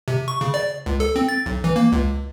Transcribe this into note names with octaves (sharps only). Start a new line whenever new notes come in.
C3
C#6
C#3
D5
C#2
A4
C4
A6
B1
E3
A#3
C#2